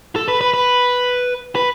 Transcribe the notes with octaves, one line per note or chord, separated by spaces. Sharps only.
A4
B4
B4
B4
B4